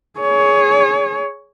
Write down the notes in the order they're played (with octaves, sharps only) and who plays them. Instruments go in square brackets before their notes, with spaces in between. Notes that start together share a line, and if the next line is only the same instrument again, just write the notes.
[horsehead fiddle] G#4 C#5